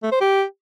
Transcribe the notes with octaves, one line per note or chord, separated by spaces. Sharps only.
A3
C5
G4